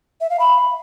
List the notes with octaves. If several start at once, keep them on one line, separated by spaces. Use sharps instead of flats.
E5
F5
B5